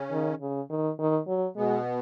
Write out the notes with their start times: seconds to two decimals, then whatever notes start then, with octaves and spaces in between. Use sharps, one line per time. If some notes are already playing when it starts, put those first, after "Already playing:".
Already playing: C#3 C#4
0.11 D#3
0.41 C#3
0.70 D#3
0.99 D#3
1.28 F#3
1.56 B2 G#3 B3